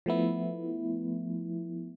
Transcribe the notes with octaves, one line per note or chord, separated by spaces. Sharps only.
F3 A3 B3 E4